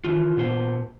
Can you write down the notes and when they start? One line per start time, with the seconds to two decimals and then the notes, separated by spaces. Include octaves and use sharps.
0.04 D#3 E3 F4
0.37 A#2 B3 C5